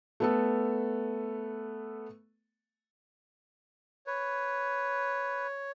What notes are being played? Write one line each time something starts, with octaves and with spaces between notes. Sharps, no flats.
A3 B3 A4
B4 C#5